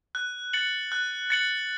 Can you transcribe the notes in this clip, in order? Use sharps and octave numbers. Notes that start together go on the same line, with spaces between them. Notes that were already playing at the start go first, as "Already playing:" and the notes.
F#6
A6 C#7 F#7
F#6
A6 C#7 F#7